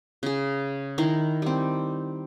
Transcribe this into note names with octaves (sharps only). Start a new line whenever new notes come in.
C#3 G#4
D#3 E4 A#5 C6
G3 C4